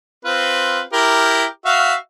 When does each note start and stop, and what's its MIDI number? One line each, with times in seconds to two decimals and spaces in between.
0.25 0.81 60
0.25 0.81 65
0.25 0.81 71
0.93 1.45 64
0.93 1.45 67
0.93 1.45 70
1.65 1.94 66
1.65 1.94 76
1.65 1.94 77